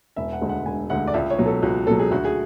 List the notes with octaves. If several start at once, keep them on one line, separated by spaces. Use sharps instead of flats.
E1 E5
F#5
D2 D3 G#3
F#5
E1 G#5
D2 D3 G#3 F#5
D5
C#2 E5
C#5
B2 F#3
A4
C#2 F#4
B2 F#3 A4
G#4
D2 F#4
G#4